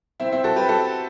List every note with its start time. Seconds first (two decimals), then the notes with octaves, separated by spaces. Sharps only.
0.20 C4 E4
0.32 C4 E4
0.44 F#4 A4
0.56 G4 B4
0.69 F#4 A4